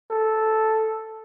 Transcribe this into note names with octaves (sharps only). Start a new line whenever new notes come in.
A4